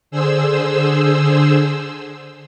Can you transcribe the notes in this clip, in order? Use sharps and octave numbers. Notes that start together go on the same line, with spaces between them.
D3 G#4 C5 E6